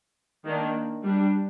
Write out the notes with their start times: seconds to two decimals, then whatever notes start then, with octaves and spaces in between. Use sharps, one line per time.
0.45 D#3 A#3 D4
1.03 G3 D4